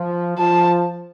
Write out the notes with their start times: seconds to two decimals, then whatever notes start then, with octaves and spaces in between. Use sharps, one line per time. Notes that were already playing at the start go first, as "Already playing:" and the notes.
Already playing: F3
0.38 F3 A5